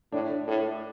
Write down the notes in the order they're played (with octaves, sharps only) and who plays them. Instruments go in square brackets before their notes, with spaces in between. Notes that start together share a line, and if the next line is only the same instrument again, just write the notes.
[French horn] A2 [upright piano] D4
[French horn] A2